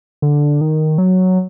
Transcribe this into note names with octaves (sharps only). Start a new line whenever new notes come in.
D3
D#3
F#3